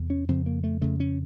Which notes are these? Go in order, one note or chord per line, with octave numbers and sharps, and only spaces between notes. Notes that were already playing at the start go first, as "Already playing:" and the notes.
Already playing: E2 C3
C#4
F2 C#3 C4
A#3
A3
F2 C#3 A3
C#4